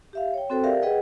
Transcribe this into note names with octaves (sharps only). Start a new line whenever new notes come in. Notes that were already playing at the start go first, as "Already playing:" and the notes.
G4 E5 F5
C#5 G5
C4 F#4 A4 C5 G5
G4 A#4 D5 E5 F5
G#4 B4 D#5 F#5 G5